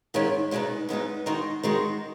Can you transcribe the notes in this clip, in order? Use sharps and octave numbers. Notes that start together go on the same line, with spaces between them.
G#2 D#3 G#3 C#4 E4
E2 B2 G#3 B3 D#4
E2 B2 G#3 B3 D#4
D#3 G#3 D#4 F#4 A#4
D#3 G#3 D#4 F#4 A#4